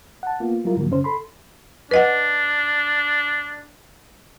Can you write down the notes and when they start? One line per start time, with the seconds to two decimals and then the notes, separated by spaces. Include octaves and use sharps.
0.23 F#5 A5
0.40 A#3 B3 F4
0.65 F#3 G3 E4 F4 A#4
0.77 G#2 D3 F3 F#3 A#3
0.90 F#2 C#3 C#4 C5
1.04 A4 B5 C6
1.91 D4 B4 D#5 F#5